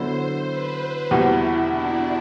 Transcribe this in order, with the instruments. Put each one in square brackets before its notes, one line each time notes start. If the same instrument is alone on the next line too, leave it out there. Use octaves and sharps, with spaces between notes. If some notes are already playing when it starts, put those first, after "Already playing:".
Already playing: [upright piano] D3 F#3 B3 E4 [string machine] C5
[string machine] B4
[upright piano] E2 B2 G3 [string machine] E4
[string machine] D4